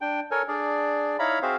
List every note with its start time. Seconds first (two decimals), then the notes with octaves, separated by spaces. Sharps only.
0.01 D4 G5
0.31 A4 A#4 C#5 G#5
0.48 D4 G#4 D5
1.19 D#4 E4 C#5 F5 A#5 B5
1.42 C4 F#4 G#4 C5 E5 F5